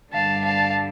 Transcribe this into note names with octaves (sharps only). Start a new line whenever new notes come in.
G2 D3 G3 F5 A5
F5 A5